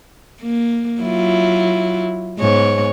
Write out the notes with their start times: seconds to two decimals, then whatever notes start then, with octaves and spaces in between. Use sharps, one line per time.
0.42 A#3
1.02 F#3 E4 F4
2.39 G#2 B3 C#5